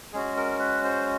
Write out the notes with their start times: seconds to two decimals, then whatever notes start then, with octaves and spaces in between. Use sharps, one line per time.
0.13 G#3 C#4 F#4 G#4
0.37 A#4
0.60 B4
0.84 C5